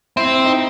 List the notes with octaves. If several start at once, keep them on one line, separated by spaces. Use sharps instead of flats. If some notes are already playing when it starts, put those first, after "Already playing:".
C4 E4
D#4